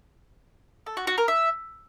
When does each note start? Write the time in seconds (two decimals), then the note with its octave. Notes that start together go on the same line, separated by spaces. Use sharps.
0.86 A4
0.97 F#4
1.07 F#4
1.18 A#4
1.28 E5